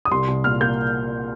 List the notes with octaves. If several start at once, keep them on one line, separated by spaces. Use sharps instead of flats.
D#6
C2 C6
C2
A#2 F6
A#3 G6